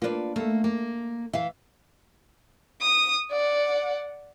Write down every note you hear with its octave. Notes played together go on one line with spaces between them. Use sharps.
A#3 D4 F4 B4 D5
A3 A#3 A4
A#3
E3 E5 F5
D#6
D5 F#5